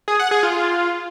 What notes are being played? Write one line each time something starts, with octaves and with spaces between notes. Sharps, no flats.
G#4
F#5
G#4
F4